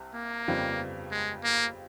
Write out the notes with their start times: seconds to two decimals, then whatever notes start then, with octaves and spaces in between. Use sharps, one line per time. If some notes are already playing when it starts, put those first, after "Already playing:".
Already playing: C2 C3
0.14 A#3
0.48 G1 F2 C#3 G3 C4
1.11 G#3
1.44 A#3